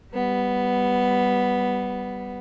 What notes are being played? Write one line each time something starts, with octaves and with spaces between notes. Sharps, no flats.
G3 B3